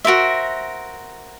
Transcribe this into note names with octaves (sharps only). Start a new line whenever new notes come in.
F#4 A#4 C5 E5